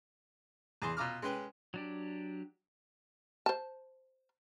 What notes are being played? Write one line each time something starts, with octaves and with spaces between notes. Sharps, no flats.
E2 G#4 C6
B2 F4 A#5 D6 E6 F6
G#3 C#4 B4 G5
F#3 D4 G4
C5 A5